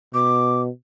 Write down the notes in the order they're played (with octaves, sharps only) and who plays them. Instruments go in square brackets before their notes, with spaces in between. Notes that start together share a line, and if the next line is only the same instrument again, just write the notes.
[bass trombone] B2 [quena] D6